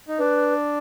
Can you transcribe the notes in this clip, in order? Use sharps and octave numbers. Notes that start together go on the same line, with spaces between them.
D#4
D4 B4